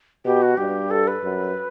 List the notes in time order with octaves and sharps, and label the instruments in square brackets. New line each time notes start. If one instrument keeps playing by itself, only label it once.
[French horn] B2 [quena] G4
[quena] F#4
[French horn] G2 [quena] G4
[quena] A4
B4
[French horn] F#2